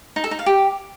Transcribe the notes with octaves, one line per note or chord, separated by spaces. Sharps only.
D#4
A4
D#4
F5
G4